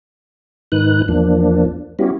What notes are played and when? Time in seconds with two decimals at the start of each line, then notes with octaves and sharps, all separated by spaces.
0.72 G#2 D#3 D#4 B4 F#6
1.08 E2 F3 A#3 D4
1.99 G3 B3 C#4 E4 F#4 G4